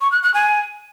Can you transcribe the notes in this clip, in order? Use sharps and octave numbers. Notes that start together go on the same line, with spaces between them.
C#6
F#6
F#6
G#5